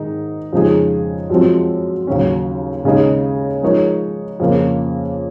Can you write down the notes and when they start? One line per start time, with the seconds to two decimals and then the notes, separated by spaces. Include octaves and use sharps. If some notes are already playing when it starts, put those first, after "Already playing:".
Already playing: G#2 D#3 G#3 D#4
0.53 F2 C#3 G#3 D#4 G#4
1.30 F#2 F3 G#3 C4
2.07 D#2 C#3 F#3 C#4
2.85 D#2 C#3 G#3 D#4 G#4
3.63 F3 G#3 D#4 A#4 C#5
4.40 F2 C#3 F3 A#3